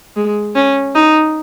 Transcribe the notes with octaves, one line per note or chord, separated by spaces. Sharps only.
G#3
C#4
D#4